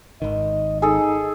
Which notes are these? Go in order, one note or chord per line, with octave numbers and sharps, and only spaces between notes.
G#1 D#3 D#5
D#4 G#4 A4